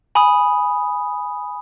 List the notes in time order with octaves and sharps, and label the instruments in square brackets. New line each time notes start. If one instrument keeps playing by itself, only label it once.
[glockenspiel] G#5 B5 D#6